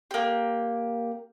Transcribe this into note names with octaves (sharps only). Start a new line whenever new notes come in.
A#3 G4